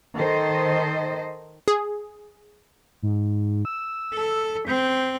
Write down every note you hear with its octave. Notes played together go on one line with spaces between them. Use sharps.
D#3 A4 C5 D#5
G#4
G#2
E6
A4
C4 G6